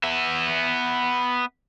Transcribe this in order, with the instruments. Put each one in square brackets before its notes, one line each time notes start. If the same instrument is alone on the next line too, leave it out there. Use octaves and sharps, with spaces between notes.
[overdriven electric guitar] B3 E5